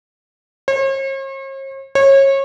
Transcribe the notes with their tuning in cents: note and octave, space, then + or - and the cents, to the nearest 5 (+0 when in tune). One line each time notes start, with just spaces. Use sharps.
C#5 -45
C#5 -25